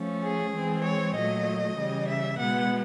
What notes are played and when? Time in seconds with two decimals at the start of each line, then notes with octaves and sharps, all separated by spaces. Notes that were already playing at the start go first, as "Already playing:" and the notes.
Already playing: F3 A3 C#4
0.22 G#4
0.53 E3 G#3 C4
0.83 C#5
1.14 A#2 F#3 A3 D#5
1.76 C#3 E3 G3
2.07 E5
2.38 B2 G#3 B3 F#5